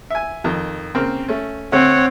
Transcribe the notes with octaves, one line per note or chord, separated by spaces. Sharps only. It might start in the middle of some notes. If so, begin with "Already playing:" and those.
E5 G#5
F2 D#3
C#3 A#3 C4
A3 C#4
D2 A3 C4 C#5 F#5